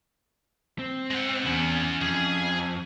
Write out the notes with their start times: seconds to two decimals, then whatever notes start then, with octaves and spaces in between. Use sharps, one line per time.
0.79 C4
1.11 G#3 F#5
1.46 E2 C#4 E4 F#5
2.02 F2 G#4